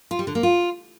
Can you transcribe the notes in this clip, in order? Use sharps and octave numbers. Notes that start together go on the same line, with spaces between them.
F4
G3
D3
A#3
F4